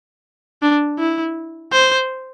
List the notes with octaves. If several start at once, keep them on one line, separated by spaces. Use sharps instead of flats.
D4
E4
C5